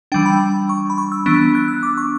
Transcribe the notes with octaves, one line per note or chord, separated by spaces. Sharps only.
E3 G3 D4 G5
B5
C#6
B5
C#6
E6
E3 B3 D4
F#6
E6
D6
C#6